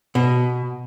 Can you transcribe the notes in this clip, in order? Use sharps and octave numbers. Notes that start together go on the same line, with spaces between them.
B2